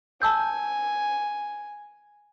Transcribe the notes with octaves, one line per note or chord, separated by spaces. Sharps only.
G#5 A5 E6 G6